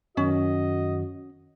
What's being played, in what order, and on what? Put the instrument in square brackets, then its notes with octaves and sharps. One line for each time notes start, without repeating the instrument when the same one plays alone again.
[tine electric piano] F#2 D#3 [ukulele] C#4 [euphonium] F#4 [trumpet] D#5